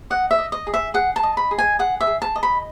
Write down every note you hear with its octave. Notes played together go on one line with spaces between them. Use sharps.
D#5 F#5
E5
D#5
D#5
G#4
E5
G#4 F#5
A5
D#5
B5
G#4
G#5
G#4 F#5
E5
G#4
A5
D#5
B5